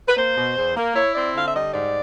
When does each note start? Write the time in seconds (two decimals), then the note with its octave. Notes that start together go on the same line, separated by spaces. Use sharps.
0.08 B4
0.17 A#3 C5
0.37 B2
0.57 E2
0.76 A#3
0.95 E4 C#5
1.15 C4 D5
1.35 D3 F5
1.46 E5
1.55 G3 D#5
1.74 G#2 D5